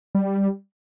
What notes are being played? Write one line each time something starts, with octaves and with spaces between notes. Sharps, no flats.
G3